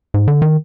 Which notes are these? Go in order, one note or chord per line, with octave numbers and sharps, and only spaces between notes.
G#2
D3
D#3